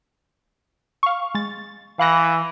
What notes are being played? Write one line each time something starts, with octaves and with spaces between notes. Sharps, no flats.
F5 C#6
G#3 A6
E3 F5 F#6 A#6